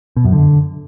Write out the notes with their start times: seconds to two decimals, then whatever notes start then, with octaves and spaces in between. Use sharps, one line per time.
0.17 B2
0.25 F#2
0.33 D3